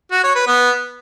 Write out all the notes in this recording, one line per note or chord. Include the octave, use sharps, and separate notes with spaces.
F#4
C#5
B4
B3